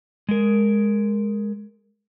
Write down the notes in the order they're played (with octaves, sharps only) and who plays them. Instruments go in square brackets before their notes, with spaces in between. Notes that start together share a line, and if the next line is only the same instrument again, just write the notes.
[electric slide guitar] G#3 A#4